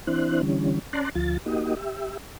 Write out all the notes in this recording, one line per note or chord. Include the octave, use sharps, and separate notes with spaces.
E3 C4 D4 E4 C5 F#6
D3 E3 G3 C#4
C#4 D5 A5 A#5 C6 F#6
D2 F3 F4 A6
A#3 D#4 F#4 G4 D#5
G4 E5